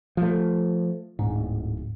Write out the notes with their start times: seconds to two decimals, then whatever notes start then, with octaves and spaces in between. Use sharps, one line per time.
0.17 F3 A3
1.19 D1 G#2